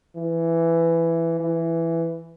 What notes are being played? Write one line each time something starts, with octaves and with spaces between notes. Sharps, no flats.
E3
E3